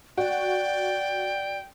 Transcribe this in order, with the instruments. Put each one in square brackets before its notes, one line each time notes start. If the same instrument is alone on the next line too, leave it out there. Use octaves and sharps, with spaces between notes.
[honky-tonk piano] F#4 [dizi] D5 [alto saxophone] G5